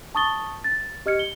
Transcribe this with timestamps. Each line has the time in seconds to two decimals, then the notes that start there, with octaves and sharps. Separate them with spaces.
0.15 A5 C#6 D#6 A6 G7
0.64 A6
1.06 G4 D#5 F6 G#6 C#7
1.19 G7